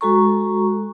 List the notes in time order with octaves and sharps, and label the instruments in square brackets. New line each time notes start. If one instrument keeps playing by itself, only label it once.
[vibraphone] G#3 F#4 A4 A#5 C#6